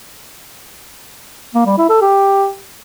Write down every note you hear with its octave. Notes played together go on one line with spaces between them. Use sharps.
A#3
G3
E4
A4
G4